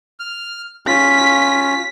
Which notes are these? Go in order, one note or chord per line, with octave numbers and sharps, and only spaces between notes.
F6
C#4 F4 B6